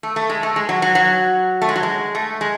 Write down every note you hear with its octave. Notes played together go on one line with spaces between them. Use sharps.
A3
A3
G#3
A3
G#3
F#3
F#3
F#3
A3
G#3
F#3
G#3
A3
G#3